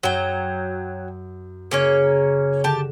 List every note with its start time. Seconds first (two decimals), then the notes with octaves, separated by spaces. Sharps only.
0.03 F#2 F#3 G5
1.71 C#3 A#3 C#4 C#5
2.64 D3 G4 A5